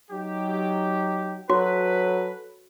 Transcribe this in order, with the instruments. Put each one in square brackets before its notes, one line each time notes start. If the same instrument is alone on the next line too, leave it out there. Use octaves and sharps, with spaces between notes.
[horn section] F#3 D#4 G4
[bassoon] F#3 [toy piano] F#4 [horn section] A4 B4